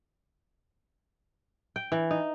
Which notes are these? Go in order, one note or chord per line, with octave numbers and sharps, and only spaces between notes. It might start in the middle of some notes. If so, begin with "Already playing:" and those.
G5
E3
D#4